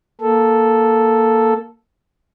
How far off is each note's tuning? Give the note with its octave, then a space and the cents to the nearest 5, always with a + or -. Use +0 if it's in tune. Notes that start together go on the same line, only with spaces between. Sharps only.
A#3 +0 A4 +0